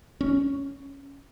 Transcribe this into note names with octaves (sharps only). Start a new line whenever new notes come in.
C#4